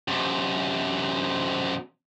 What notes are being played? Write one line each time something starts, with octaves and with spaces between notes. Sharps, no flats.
F#2 C3